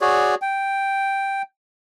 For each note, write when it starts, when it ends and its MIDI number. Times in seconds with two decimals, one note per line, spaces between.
0.01 0.35 66
0.01 0.35 68
0.01 0.35 73
0.01 0.35 74
0.42 1.42 79